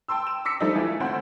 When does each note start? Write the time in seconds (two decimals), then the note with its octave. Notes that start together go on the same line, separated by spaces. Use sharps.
0.08 G5 A5 C6 E6
0.27 E7
0.45 D6 E6 B6 C#7
0.60 F3 G3 A3 D4 D#4
0.76 E3 A3 F4
1.00 D2 C4 C5 F#5